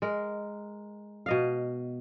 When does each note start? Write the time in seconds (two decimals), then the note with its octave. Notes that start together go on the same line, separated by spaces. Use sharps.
0.02 G#3 A#4
1.26 B2 D#5 F5